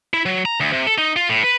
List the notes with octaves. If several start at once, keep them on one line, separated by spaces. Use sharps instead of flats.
E4
F#3
A#5
D2
C3
A4
D#4
F4
A2
B4